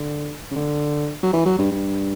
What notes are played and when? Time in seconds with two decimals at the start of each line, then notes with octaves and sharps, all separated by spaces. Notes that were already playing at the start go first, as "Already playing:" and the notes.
Already playing: D3
0.51 C#3
0.56 D3
1.23 F#3
1.33 E3
1.46 F#3
1.58 G2
1.72 G2